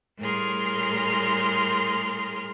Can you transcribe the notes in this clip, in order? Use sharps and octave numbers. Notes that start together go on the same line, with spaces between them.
A2 G3 G#4 A#4 C6 F6